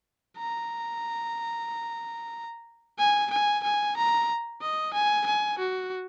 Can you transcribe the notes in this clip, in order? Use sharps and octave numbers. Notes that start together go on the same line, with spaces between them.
A#5
G#5
G#5
G#5
A#5
D#5
G#5
G#5
F#4